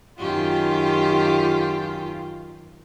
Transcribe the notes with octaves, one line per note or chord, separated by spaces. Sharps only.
F#2 D#3 F4 G4